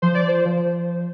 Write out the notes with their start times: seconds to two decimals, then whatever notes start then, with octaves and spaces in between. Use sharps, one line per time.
0.02 F3 C5
0.15 D5
0.28 C5
0.45 F3